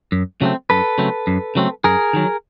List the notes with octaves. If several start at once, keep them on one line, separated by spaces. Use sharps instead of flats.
F#2
C#3 F#3 A3 C4
F#2 A4 B4
C#3 F#3 A3 C4
F#2
C#3 F#3 A3 C4
F#2 G#4 A#4
D#3 F#3